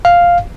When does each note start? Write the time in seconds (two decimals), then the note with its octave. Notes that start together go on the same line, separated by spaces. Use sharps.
0.05 F5